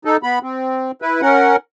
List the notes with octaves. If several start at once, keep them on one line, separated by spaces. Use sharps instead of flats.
D#4 A4
B3 B5
C4
E4 B4
C#4 A#4 F#5